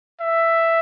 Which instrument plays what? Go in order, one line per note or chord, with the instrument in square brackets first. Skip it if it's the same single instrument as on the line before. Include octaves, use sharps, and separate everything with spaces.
[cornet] E5